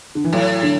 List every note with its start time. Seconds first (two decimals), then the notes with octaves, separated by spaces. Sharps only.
0.15 D3
0.24 E3
0.33 A2 F#3
0.63 D3